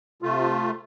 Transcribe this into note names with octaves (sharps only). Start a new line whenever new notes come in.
C3 A3 F4